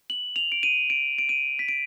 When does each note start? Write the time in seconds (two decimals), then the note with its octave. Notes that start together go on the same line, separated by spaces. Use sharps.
0.10 F#7
0.36 F7
0.52 D7
0.63 D#7
0.90 D7
1.18 D7
1.29 D#7
1.59 B6
1.68 D7